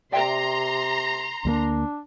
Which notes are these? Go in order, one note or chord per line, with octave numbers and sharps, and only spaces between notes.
C3 D5 E5 G5 A#5 C6
D2 G3 A#3 D4